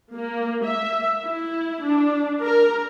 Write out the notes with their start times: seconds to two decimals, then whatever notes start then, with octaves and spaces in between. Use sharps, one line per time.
0.14 A#3
0.66 E5
1.25 E4
1.85 D4
2.43 A#4